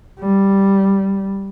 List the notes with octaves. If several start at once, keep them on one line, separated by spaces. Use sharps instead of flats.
G3